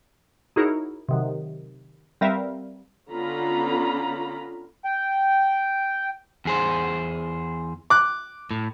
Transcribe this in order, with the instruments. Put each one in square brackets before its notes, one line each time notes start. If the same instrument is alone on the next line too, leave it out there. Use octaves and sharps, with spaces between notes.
[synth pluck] D#4 E4 F#4 G#4 A#4 C#5
C3 D#3 F#3
G3 C4 A#4 B4 E5 F5
[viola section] D3 B3 C#4 F4 A#5 B5
[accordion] G5
[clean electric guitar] E2 G#4 C5
[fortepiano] D6 F#6
[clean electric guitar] A2